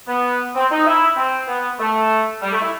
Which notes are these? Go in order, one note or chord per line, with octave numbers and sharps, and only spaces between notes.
B3
C4
D#4
E4
C4
B3
A3
G3
A3
E4